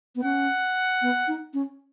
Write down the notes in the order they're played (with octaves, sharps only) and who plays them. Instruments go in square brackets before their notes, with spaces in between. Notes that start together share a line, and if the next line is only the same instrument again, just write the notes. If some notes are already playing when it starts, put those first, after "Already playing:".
[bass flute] B3
[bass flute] C#4 [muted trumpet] F#5
[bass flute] B3
D#4
C#4